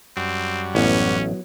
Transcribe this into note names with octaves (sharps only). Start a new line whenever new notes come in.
F#2 G3 C4 F#4
A1 F#3 B3 C#4 E4